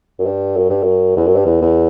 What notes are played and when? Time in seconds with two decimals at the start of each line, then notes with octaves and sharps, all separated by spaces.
0.19 F#2
0.26 G2
0.56 F#2
0.70 G2
0.83 F#2
1.17 E2
1.26 F#2
1.36 G2
1.46 E2
1.62 E2